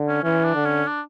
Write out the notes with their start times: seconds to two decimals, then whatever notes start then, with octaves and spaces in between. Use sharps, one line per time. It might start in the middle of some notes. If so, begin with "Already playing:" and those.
Already playing: D3
0.08 C#4
0.24 E3 C#4
0.44 D4
0.55 D3
0.65 C#4
0.87 D4